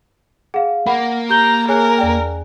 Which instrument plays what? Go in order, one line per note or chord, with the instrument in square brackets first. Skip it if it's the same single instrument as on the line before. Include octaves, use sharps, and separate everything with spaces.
[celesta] G#4 F5 [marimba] F#5
[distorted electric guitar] A#3 [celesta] F#5 [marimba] B5
[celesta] G4 G6 G7 [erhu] A#5
[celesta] G#4 G#5 F#6 [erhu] A#4 [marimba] C#5
[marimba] E2 D5 G5